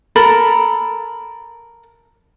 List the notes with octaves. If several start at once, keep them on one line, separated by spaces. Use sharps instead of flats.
A4 A#4 B5